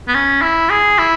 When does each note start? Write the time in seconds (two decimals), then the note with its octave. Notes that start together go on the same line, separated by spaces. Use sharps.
0.08 B3
0.15 C#4
0.42 E4
0.70 G#4
0.99 E4